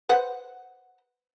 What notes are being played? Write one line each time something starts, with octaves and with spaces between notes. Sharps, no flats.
B4 C5 F#5